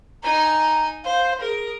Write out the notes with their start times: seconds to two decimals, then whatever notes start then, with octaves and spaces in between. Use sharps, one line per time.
0.23 D#4 G#5 A#5
1.04 C5 F5
1.40 G#4 A#4